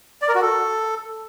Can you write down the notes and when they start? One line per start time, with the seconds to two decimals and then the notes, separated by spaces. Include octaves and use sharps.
0.22 D5
0.28 A#4
0.35 F#4
0.42 A4